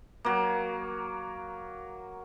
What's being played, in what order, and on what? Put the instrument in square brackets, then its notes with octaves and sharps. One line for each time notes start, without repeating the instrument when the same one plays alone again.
[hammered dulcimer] F#3 A#3